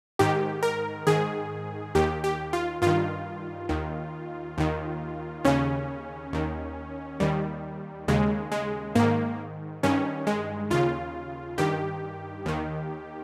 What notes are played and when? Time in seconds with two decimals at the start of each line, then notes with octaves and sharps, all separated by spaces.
0.19 G#2 D#3 G4
0.63 A#4
1.07 G#2 D#3 G#4
1.95 D#2 D#3 G4
2.24 G4
2.53 F4
2.82 G2 D#3 F4
3.69 D#2 D#3
4.58 D#2 D#3
5.45 D#2 C#3 C#4
6.33 D#2 D#3
7.20 D#2 D#3 G3
8.08 D#2 C#3 G#3
8.52 G#3
8.95 G#2 D#3 A#3
9.83 G2 D#3 C#4
10.27 G#3
10.70 D#2 C#3 F4
11.58 G2 D#3 G4
12.46 D#2 D#3